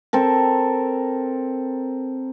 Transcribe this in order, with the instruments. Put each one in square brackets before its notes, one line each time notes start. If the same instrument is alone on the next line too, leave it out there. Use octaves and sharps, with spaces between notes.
[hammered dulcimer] C4 A4 A#4